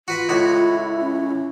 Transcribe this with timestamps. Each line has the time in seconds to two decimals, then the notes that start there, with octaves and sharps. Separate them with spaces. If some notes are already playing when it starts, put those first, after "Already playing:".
0.08 F4 F#4 B4 B5
0.29 C#2 A2 E4 F#4
1.00 C#4